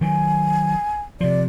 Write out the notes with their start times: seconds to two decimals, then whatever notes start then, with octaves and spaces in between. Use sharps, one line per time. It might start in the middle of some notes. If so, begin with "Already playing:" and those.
0.01 D#3 F#3 G#5
1.21 C3 F3 D5